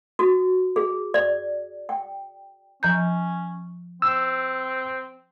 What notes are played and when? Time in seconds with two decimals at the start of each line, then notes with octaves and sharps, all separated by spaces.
0.19 F#4
0.76 G#4
1.14 D5
1.89 G5
2.83 F3 C#4 A#5 G6
4.02 C4 E6